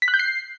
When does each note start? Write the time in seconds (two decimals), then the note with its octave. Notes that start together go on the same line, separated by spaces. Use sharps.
0.02 B6
0.08 F#6
0.14 G6
0.19 C7